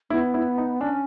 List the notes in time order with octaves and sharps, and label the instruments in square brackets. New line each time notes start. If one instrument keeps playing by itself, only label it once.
[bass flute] B3 [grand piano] E4
[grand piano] E4
D#4
[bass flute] C#4 [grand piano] D4